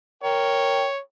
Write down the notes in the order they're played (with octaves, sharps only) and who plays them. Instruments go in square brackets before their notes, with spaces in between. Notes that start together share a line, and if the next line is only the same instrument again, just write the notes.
[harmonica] A#4 G5 [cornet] C#5